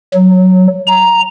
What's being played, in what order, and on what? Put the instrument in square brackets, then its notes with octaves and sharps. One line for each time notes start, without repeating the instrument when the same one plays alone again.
[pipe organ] F#3
A#5